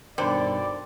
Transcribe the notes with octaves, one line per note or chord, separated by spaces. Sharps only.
G2 B2 D3 D#3 C5 D5 G5 B5